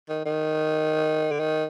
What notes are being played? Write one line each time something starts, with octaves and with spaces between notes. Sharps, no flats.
D#3
D#3
D3
D#3